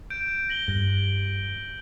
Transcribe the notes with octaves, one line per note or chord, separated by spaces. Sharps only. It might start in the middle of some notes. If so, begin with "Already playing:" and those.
G6 D7
A#6 F#7 G7
G2